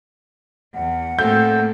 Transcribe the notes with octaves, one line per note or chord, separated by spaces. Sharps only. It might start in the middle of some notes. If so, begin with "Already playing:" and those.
E2 F#5
A2 A#3 C4 A4 G6